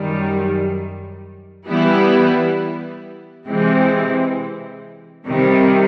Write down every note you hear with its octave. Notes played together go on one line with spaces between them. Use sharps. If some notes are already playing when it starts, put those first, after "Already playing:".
Already playing: F#2 D#3 G3
E3 G3 B3 E4
C3 E3 G#3 C4
C3 D#3 G3